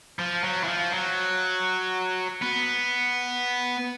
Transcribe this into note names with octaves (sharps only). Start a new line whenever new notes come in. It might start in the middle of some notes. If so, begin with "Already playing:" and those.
F3
F#3
E3
F3
F#3
B3